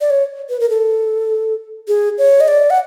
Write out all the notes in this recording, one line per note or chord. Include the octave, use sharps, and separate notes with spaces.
D5
C#5
B4
A#4
A4
G#4
C#5
D#5
D5
F#5